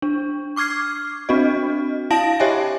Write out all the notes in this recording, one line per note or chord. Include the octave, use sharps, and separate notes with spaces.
D4
C#6 D6 F6 G#6 C7
C4 D4 F#4 D#5
E4 F5 A5 A#6 D7 F#7
G4 C#5 D#5 E5 G5 G#5